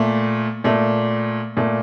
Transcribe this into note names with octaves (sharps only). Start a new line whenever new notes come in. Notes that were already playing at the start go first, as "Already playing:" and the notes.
Already playing: A#2 A3
A#2 A3
A#2 A3